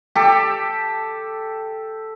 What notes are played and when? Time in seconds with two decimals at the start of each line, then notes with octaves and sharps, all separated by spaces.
0.15 G4 A4